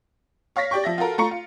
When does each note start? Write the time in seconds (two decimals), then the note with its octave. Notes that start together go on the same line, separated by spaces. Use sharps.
0.56 C#5 F5 C#6 A#6 B6
0.71 G4 D5 G5 C#6
0.84 F3 E5 A#6
0.98 F4 F#4 A4 A#4
1.18 A3 F4 A#5 C#6 C#7
1.31 F4